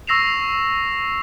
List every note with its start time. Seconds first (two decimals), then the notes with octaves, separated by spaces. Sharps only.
0.07 C#6 E6 A#6 C7 E7 F7